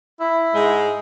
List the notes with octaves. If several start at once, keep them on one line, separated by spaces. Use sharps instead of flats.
E4
G#2 G#3